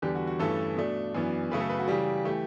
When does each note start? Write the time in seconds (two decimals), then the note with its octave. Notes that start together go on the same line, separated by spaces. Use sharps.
0.02 E2 D3 G3 G4
0.15 F#4
0.27 F#4
0.39 G2 E3 A3 C#4 A4
0.77 B2 A3 D4
1.15 F#2 E3 B3 D4
1.51 F#2 C#3 F#3 A3 B4
1.60 A4
1.70 B4
1.79 F#4
1.88 C#3 E3 G3 G4
2.25 E3 A3 G4